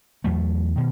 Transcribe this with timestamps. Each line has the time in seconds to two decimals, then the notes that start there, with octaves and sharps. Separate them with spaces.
0.24 E2 F#3 A3
0.76 B2 D#3